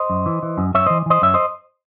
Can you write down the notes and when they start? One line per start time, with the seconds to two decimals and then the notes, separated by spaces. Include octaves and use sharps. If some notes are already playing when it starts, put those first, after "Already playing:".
Already playing: C5 D#5
0.10 F#2
0.26 E3
0.43 E3
0.58 F#2
0.74 F#2 C#5 E5
0.86 E3 C5 D#5
1.06 E3 C5 D#5
1.22 F#2 C#5 E5
1.34 C5 D#5